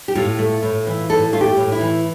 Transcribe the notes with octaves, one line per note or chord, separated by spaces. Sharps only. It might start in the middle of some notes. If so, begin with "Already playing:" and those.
G4
A2 F4
A3
A2
E3
A2 A4
A3 F4
G4
A2
E4
E3